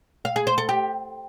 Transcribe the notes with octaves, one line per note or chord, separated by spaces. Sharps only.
F5
G#4
C5
A4
G4